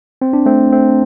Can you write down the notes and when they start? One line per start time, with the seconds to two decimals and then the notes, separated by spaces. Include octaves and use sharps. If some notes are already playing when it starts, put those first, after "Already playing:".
0.22 C4
0.33 D4
0.46 A3 C4
0.72 A3 C4